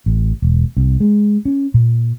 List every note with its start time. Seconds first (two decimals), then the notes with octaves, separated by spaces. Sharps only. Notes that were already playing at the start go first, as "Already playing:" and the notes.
0.06 A1
0.42 E1
0.77 C2
1.00 G#3
1.45 C#4
1.74 A#2